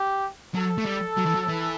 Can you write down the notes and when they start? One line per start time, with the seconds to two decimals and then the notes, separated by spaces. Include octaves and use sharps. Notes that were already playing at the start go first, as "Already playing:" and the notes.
Already playing: G4
0.55 F#3 A4
0.78 A3
0.86 G3
1.17 F#3
1.26 E3
1.35 F#3
1.48 E3